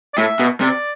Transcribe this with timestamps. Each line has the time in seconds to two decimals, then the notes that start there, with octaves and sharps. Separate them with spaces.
0.14 D5
0.17 A2 E5
0.39 B2
0.61 C3 D5